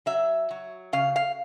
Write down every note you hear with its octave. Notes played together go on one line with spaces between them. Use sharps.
F#3 E5
F#3
C#3 F5
F5